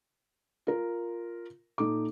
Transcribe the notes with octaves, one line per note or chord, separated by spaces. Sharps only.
F4 A#4
A#2 D#4 A4 D6